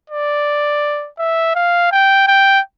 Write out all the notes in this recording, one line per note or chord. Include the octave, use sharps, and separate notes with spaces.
D5
E5
F5
G5
G5